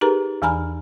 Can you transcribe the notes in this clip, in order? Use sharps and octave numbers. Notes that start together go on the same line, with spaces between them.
D#4 G4 G#4 A#4 B4 A#5
E2 E3 G#5 A#5 B5 F6